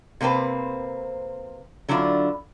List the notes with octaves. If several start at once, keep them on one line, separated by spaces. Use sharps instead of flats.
C3 A#3 C4 B4 C5
D3 F#3 D4 E4 F4